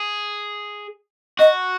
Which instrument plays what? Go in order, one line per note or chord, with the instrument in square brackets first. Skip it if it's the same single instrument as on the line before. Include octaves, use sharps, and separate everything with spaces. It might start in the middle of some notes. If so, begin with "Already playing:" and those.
Already playing: [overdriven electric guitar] G#4
[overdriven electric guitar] F#4 [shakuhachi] D#5